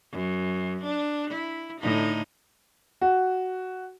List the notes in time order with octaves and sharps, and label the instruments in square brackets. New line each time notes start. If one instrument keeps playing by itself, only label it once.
[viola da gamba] F#2
D4
E4
A2 D3 D#4
[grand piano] F#4